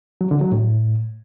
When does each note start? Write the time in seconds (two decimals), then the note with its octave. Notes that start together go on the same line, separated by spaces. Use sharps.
0.21 F#3
0.31 D3
0.41 F#3
0.52 A2